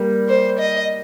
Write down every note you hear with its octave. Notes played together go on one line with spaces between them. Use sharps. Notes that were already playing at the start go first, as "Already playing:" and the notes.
Already playing: G3 A#3
C5
D#5